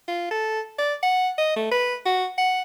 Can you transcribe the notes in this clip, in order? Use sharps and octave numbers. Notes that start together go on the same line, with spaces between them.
F4
A4
D5
F#5
D#5
A3
B4
F#4
F#5